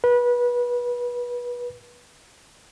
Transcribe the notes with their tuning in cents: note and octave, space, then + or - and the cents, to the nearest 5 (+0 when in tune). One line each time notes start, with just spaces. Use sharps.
B4 -25